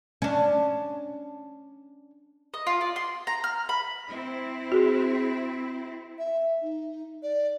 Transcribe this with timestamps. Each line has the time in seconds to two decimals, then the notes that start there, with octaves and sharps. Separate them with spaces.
0.22 C#4 D4
2.54 D#5
2.67 F4
2.81 D5
2.96 C6
3.27 A#5
3.44 F6
3.69 B5
4.08 C4 E4
4.72 F#4 G#4
6.18 E5
6.62 D#4
7.23 D5